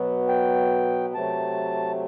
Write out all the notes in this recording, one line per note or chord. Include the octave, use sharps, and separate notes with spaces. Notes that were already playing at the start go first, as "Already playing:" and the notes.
Already playing: B2 F#3 B3
G5
C3 F#3 A3 A5